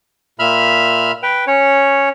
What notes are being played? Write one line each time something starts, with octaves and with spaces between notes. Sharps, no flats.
A#2 E5 B5 F6
B4 G5
C#4 C#5